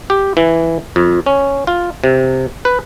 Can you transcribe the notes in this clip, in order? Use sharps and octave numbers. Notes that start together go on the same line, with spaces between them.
G4
E3
F2
C#4
F4
C3
B4